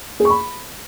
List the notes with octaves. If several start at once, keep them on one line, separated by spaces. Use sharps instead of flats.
G#4
C#6
B5